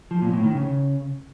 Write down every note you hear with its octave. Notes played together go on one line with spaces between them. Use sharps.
F3
A#2
A2
D#3
C#3